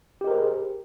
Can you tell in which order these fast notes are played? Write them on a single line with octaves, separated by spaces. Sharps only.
G4 D#5 A#4 C5 G#4